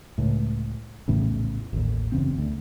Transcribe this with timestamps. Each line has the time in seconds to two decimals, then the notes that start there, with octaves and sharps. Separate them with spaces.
0.18 C#2 A2
1.08 A#1 E2 A2 C#3
1.73 A1 D#2
2.12 F#1 E2 C#3 C4
2.38 D2